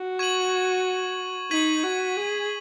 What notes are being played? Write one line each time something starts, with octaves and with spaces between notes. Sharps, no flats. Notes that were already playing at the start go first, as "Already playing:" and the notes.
Already playing: F#4
C#6 G#6 D#7 F#7
D#4 G#6 B6 D#7 F#7
F#4
G#4